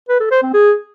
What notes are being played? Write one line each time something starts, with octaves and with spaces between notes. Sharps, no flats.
B4
A4
C5
C4
G#4